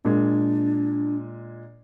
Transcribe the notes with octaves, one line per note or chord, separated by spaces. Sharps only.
A#2 G#3 D4